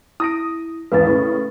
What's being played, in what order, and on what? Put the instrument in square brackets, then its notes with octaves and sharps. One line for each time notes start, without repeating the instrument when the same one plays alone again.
[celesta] E4 [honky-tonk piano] D#6 A#6 D7
[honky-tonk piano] G#1 E2 [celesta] B4 A6
[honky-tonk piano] A2 C#3